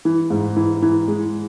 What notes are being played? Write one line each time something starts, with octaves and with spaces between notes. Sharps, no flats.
E3
G#2
E3
E3
G#3